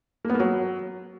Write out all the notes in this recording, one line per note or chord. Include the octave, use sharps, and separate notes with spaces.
A#3
B3
A#3
F#3